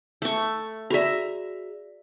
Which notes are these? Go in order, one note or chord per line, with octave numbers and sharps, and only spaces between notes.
A3 C#6
F#4 G#4 D5 E5 A#5